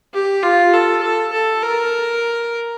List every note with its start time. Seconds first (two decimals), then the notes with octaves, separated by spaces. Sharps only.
0.14 G4
0.43 F4
0.74 A4
1.03 A4
1.33 A4
1.63 A#4